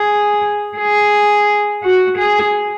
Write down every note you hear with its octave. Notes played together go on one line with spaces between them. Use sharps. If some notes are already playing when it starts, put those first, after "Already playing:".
Already playing: G#4
G#4
F#4
G#4